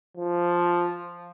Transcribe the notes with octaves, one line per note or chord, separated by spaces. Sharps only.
F3